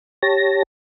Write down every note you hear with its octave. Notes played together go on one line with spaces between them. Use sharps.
G4 C#5 A5 A#6